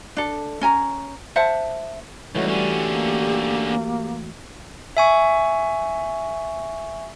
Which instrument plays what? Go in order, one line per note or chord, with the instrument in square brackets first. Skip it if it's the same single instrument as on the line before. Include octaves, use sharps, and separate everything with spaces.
[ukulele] D4 A4
C#4 G#5 A#5
C5 E5 F#5 A5
[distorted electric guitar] C#2 [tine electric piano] E3 A3 F#4 [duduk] G3 [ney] C#5
[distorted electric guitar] D3 C#4 [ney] G4
[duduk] A#3
[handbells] E5 G#5 C#6